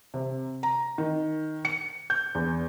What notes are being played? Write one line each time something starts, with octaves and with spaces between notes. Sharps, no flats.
C3
A#5
D#3
C#7
G6
E2